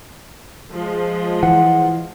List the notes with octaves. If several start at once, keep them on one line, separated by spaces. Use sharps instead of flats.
F3 G#3
E3 F#5